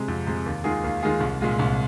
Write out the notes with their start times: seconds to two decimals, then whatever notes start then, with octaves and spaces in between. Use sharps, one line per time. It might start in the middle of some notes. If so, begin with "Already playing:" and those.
Already playing: C3 G#3
0.08 F2
0.27 C3 G#3
0.46 D#2
0.64 D#3 G#3 F4 G#4
0.84 D#2
1.03 D#3 G#3 F4 G#4
1.21 C2
1.41 A#2 G#3 F4
1.59 C2